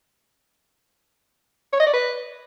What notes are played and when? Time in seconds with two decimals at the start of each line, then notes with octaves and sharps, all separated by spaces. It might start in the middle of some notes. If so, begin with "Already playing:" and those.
1.73 C#5
1.80 D#5
1.87 D5
1.94 B4